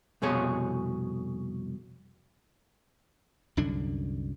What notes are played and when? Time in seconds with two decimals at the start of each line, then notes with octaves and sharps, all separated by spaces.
0.22 C2 F2 B2 G#4 C#5
3.57 C2 F#2 D3 D4